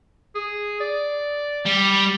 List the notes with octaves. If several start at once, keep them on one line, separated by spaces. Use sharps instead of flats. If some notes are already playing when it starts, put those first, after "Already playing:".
G#4
D5
G3